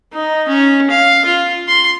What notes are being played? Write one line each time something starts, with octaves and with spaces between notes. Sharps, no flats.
D#4
C#4
F5
F4
C6